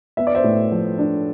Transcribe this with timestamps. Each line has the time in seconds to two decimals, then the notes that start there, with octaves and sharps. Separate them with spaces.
0.17 B3 E5
0.27 D5
0.35 C5 E5
0.44 A2
0.72 F3
0.98 D4